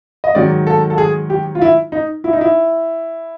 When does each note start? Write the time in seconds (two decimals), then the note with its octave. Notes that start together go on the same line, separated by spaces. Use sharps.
0.24 D#5
0.35 G#2 D#3 F#3 D5
0.67 A4
0.90 A4
0.98 G#4
1.30 G4
1.55 F4
1.61 E4
1.92 D#4
2.24 E4
2.33 D#4
2.41 E4